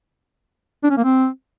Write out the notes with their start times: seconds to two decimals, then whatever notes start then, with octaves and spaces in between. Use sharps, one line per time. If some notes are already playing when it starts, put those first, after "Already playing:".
0.84 D4
0.91 C#4
0.97 A#3
1.04 C4